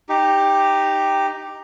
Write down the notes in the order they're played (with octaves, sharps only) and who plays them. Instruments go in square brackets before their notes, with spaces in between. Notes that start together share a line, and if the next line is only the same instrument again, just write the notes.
[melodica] D#4 G4